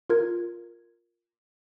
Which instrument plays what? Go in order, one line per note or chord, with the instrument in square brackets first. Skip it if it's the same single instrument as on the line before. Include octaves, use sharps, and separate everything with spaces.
[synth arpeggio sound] F4 A#4 G#6